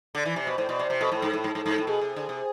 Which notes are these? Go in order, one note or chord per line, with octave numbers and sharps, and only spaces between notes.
D3 D5
E3
C3
B2
A2 C5
B2
C3
C3
B2 A4
A2
G#2
A2
G#2
G#2
G#2
A2
B2 G#4
C3
D3
C3